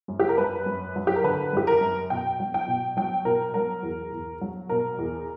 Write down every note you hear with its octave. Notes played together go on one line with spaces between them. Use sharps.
F#2
G4
A#4
F#2 B4
F#2
F#3
G4
A#4
D3 B4
F#2 G4
A#4
F#2
B2 G5
F#3
G5
B2
F#3 G5
B2 A#4
F#3 A#4
E2
E2
F#3
B2 A#4
E2